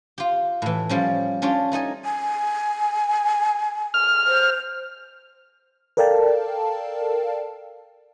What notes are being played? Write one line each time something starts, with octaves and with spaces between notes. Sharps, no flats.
F4 G4
A2 E3
F3 G3 C#4
C#4 D4 F4 G4
A3 D#4 D#5 G#5
G#5
F6
C5
A4 A#4 D5 F5 G5 A5